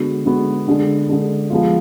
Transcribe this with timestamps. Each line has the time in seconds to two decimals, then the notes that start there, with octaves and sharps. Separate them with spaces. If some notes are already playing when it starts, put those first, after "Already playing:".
Already playing: D3 G#3 B3 F#4
0.25 D3 G#3 B3 F#4
0.68 D3 G#3 D4
1.09 D3 G#3 D4
1.50 F3 G#3 B3 F4